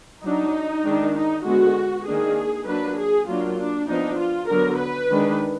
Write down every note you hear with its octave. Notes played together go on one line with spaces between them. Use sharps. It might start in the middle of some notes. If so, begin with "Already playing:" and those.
F#3 D4 D#4
D#3 G#3 D4
D#4
D3 G#3 B3 F#4
D#3 A#3 D4 G#4
F#3 A#3 D4 B4
G#4
F#3 A#3 D4 F4
D4
F3 B3 D4 D#4
F4
D3 F#3 B3 A#4
B4
D#3 G#3 D4